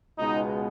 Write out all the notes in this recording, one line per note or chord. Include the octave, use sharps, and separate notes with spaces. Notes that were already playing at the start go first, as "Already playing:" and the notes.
C#2 B2 G#3 B3 D#4